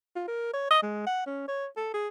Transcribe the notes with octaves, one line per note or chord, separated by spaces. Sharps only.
F4
A#4
C#5
D#5
G#3
F#5
C#4
C#5
A4
G#4